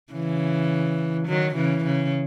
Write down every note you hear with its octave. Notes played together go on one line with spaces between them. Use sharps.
C#3 E3
D#3 F#3
C#3 E3
C#3